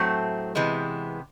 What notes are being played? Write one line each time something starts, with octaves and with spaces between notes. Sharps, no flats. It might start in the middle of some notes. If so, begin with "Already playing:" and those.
Already playing: A2 F#3 A3 C4
C3 E3 G#3 B3